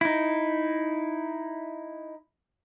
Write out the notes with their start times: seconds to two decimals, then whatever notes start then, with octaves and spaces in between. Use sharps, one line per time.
0.01 D#4 E4